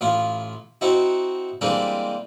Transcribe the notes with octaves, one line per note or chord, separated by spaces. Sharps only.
A1 E4 F4
C4 D#4 E4 F#4
E3 G3 G#3 A#3 C4 D4